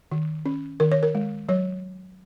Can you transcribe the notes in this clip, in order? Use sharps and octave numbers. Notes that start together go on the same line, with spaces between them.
D#3
C#4
D#3 A#4
C#5
A#4
G#3
F#3 C#5